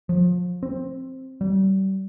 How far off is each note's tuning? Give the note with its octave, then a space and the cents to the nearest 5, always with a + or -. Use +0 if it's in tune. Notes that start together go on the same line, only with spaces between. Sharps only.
F3 +30
C4 +10
G3 -35